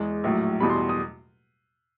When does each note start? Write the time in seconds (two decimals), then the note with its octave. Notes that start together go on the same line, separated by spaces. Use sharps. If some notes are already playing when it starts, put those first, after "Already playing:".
Already playing: E2 G#3
0.24 A#1 A2 F#3
0.60 E2 B2 G3 B5
0.69 C6
0.89 D#6